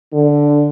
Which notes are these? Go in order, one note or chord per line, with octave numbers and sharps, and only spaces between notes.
D3